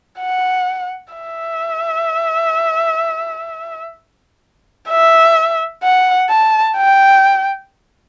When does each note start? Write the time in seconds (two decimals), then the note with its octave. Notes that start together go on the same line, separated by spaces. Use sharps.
0.20 F#5
1.14 E5
4.89 E5
5.83 F#5
6.30 A5
6.77 G5